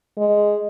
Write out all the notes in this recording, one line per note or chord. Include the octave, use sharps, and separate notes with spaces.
G#3